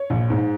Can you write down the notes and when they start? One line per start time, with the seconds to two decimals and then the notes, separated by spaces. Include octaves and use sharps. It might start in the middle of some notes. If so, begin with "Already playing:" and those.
Already playing: C#5
0.10 A#1
0.30 G#2